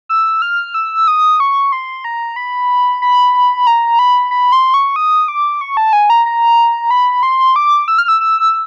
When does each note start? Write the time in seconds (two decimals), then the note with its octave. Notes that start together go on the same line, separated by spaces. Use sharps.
0.09 E6
0.42 F6
0.74 E6
1.08 D#6
1.40 C#6
1.72 C6
2.04 A#5
2.36 B5
3.02 B5
3.67 A#5
3.99 B5
4.31 B5
4.52 C6
4.74 C#6
4.96 D#6
5.28 D6
5.61 C#6
5.77 A5
5.93 G#5
6.10 A#5
6.26 A#5
6.91 B5
7.23 C6
7.56 D6
7.88 E6
7.98 F6
8.08 E6
8.21 E6